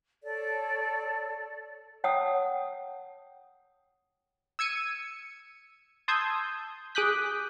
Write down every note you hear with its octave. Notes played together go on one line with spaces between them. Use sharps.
A4 C#5 D5
C#5 F#5 G5 A5 D#6 E6
E6 G#6 C#7 D#7
A5 C6 D#6 E6 G6 G#6
G#4 D6 D#6 F#6 G6 B6